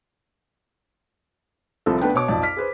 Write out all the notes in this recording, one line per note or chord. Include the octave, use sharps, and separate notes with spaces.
C2 C3 F3 C4 A4
A3 B3 D4 B4 G5
B2 C#5 D6
B1 F2 D5 A5
F6 B6
G#4 B4 C5